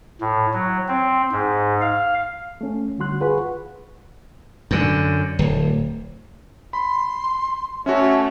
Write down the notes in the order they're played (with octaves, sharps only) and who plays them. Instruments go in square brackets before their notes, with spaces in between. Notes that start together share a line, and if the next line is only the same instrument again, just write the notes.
[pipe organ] A2
F#3
C4
G#2
F5
[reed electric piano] A3 C#4
D2 D3 G3 F#4 C6 F#6
F4 G#4 B4 F#5 B5 C#6
[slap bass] F#2 D3
D1
[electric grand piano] B5 [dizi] C6
[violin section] A3 C#5 [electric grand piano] C#4 F#4 [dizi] E5